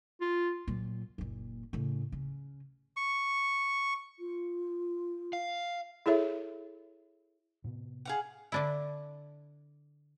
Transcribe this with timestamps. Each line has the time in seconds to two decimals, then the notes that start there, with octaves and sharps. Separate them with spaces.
0.21 F4
0.68 A#2 F#3
1.18 F#1 A#2
1.73 A2 C#3
2.12 C#3
2.97 C#6
4.19 F4
5.33 F5
6.06 E4 G#4 A4 C#5 E5
7.64 A2 C3 B3
8.05 G#4 F5 F#5
8.52 D3 D4 E4